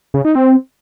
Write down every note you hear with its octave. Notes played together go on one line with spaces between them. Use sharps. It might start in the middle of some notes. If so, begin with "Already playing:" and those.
C#3
D#4
C4